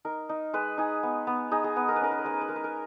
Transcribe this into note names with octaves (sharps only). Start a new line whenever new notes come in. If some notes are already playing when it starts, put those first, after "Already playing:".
D#4 A#4
D#4
G#3 B4
D#4 G#4
B3
B3
D#4 G#4
G#4
B3 B4
A#4
B4
C#4 A#4
B4
A#4
G#3 B4
A#4
B4
G#3 A#4
B4
A#4